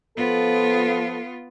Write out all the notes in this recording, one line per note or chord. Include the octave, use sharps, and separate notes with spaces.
F3 B3 F4 A4